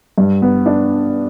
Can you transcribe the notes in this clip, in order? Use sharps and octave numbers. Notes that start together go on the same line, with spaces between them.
G2
B3
D4